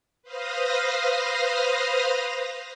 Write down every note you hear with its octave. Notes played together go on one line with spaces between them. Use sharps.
B4 C5 F5 D#6 F6 A#6